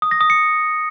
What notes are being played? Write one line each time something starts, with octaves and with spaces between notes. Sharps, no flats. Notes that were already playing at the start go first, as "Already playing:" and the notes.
D#6
A#6
D#6
C#7